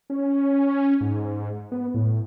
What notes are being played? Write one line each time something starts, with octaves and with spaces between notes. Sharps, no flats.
C#4
G#2
B3
A2